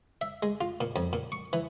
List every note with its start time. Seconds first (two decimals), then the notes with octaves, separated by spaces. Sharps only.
0.21 E5
0.43 G#3
0.61 F4
0.81 A#2
0.96 F2
1.13 A#2
1.32 C#6
1.53 E3